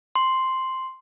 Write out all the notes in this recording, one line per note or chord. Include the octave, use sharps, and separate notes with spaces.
C6